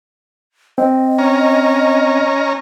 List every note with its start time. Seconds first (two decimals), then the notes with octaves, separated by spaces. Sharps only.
0.78 C4 D#5
1.18 C#4 A#5